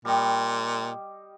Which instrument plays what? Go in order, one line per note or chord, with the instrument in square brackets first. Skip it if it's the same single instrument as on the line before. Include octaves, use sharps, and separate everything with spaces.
[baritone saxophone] A#2 [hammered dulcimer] G3 D#5